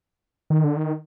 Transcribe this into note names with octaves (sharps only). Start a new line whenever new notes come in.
D#3
D3
D#3